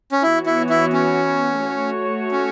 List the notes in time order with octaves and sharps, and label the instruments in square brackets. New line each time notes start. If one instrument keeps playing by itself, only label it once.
[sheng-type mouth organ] C#4
[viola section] E3 B3 F#4 C#5 [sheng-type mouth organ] E4
[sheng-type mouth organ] E4
E4
C#4
[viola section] A3 F#4 C#5
[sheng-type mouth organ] C#4